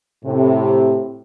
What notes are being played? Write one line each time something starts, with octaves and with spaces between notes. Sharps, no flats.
A2 C3